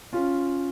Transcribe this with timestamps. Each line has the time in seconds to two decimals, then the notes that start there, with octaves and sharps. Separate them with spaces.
0.13 C#4 F4